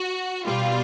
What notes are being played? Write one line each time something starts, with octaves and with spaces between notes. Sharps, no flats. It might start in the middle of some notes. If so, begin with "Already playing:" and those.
Already playing: F#4
B2 G3 F4